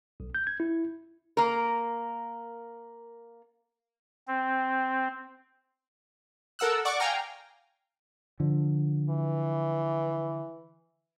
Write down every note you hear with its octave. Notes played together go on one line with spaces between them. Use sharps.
B1
G6
G#6
E4
A#3 A#4
C4
A4 A#4 F#5 E6 F#6
D5 F#5 C#6 D6
F5 G5 G#5 A#5 F6
D3 F3
E3